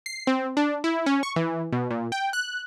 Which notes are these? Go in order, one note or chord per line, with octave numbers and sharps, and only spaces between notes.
C7
C4
D4
E4
C#4
C#6
E3
B2
A#2
G5
F#6